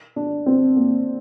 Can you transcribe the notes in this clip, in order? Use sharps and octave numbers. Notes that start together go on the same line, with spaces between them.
D4
C4
A#3